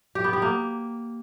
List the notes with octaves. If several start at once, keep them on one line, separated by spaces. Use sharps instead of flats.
G4
B3
G4
A#3